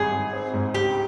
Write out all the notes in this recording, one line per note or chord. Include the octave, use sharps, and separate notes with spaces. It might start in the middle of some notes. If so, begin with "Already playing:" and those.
Already playing: G#1 G3 G#4
G#1
C4
G#2
C#2 G4